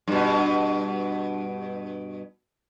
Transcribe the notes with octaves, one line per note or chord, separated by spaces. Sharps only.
G2 B2